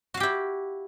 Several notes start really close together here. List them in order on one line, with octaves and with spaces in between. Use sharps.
F#4 F5 G4 E4